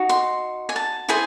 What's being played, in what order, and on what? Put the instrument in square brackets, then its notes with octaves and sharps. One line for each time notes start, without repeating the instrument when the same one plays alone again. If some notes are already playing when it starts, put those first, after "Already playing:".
Already playing: [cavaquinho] D#4 F#4
C6
G#5
A5
E4 G#4 C5